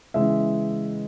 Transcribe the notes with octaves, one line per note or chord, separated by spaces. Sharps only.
C#3 E3 G#3 B3 E5